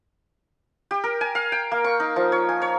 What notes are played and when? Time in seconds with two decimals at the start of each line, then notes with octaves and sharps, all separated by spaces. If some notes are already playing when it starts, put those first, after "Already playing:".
0.91 G4
1.04 A#4
1.21 G#5
1.35 F5
1.52 G5
1.71 A#3
1.84 C#6
2.00 D#4
2.16 F3
2.32 C#5
2.49 G#5
2.62 C#5